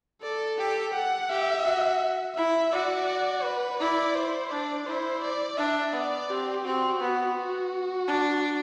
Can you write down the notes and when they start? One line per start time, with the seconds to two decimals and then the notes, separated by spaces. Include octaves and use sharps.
0.22 A4 D5
0.58 G4
0.95 F#5
1.30 G4 E5
1.65 F#4
2.36 E4 E5
2.72 F#4 D5
3.44 B4
3.80 E4 D5
4.16 C5
4.51 D4 D5
4.86 E4 C5
5.23 D5
5.58 D4 E5
5.93 B3 D5
6.29 C4 G4
6.65 C4 F#4
7.01 B3
7.37 F#4
8.08 D4